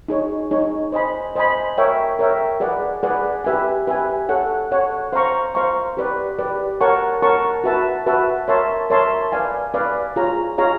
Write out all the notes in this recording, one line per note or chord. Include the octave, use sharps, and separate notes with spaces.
D#4 G#4 C#5
D#4 G#4 C#5
C5 D#5 G#5 B5
C5 D#5 G#5 B5
A#4 C#5 E5 G5
A#4 C#5 E5 G5
G#4 B4 D5 F#5
G#4 B4 D5 F#5
G4 B4 E5 G#5
G4 B4 E5 G#5
A4 C#5 F#5
A4 C#5 F#5
C5 F5 A#5 C#6
C5 F5 A#5 C#6
G4 B4 D5
G4 B4 D5
A#4 C#5 F#5 A5 C#6
A#4 C#5 F#5 A5 C#6
F#4 B4 E5 A5
F#4 B4 E5 A5
A#4 C#5 E5 A5 C6
A#4 C#5 E5 A5 C6
B4 D5 F5 G#5
B4 D5 F5 G#5
F4 G#4 C#5 F5 A#5
F4 G#4 C#5 F5 A#5